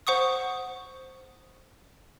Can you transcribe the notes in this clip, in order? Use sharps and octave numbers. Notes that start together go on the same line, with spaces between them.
C5 F#5 C#6 D#6